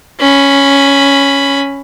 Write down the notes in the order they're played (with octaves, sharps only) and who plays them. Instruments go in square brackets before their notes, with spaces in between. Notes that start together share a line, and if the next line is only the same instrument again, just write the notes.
[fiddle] C#4 B5